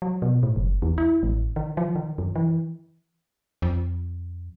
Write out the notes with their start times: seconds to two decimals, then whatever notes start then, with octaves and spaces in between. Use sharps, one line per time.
0.02 F#3
0.22 B2
0.43 A2
0.56 F#1
0.82 E2
0.98 E4
1.23 A1
1.56 D#3
1.77 F3
1.96 D#3
2.18 F#2
2.36 E3
3.62 F2